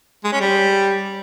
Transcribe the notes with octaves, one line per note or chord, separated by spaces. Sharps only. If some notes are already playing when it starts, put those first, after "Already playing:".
G#3
C#4
G3